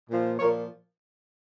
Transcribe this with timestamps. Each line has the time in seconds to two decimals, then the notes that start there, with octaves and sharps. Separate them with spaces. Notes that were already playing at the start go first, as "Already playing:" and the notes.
0.09 A#2 F3
0.38 A#2 F3 A#4 C#5